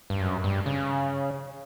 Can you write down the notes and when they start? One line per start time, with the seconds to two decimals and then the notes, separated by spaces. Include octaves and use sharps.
0.10 G2
0.21 F#2
0.44 G2
0.66 C#3